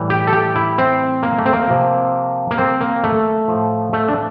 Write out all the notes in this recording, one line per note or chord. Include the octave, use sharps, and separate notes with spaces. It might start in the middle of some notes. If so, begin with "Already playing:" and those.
Already playing: A2 E3 G3
G4
A4
G4
E4
C4
A#3
A3
C4
A#3
C3 F3
A#3
C4
A#3
A3
A2 F3
A3
D4